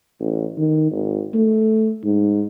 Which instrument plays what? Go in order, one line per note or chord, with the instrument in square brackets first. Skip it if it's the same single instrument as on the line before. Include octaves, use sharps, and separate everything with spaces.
[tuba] A1
D#3
G#1
A3
G#2